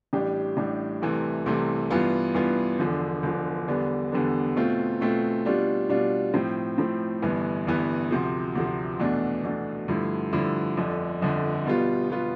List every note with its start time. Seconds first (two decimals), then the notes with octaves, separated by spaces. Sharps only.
0.13 A1 A2 G3 D4 G4
0.57 A1 A2 G3 D4 G4
1.01 C2 C3 E3 A3
1.46 C2 C3 E3 A3
1.90 G2 E3 B3 F4
2.35 G2 E3 B3 F4
2.79 E1 E2 D3 F3
3.23 E1 E2 D3 F3
3.68 E2 D3 G3 B3 D4
4.12 E2 D3 G3 B3 D4
4.56 B2 A3 C4 F4
5.01 B2 A3 C4 F4
5.45 B2 G3 D4 F4
5.89 B2 G3 D4 F4
6.34 A2 F3 C4
6.78 A2 F3 C4
7.22 G1 G2 E3 B3
7.67 G1 G2 E3 B3
8.11 D2 C3 F3
8.56 D2 C3 F3
9.00 E2 B2 A3 D4
9.44 E2 B2 A3 D4
9.88 G2 D3 F3 A3 E4
10.33 G2 D3 F3 A3 E4
10.77 G1 F2 D3
11.22 G1 F2 D3
11.66 B2 G3 B3 F4
12.10 B2 G3 B3 F4